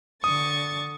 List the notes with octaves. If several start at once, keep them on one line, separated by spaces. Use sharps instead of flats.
D3 C#6 D#6 A6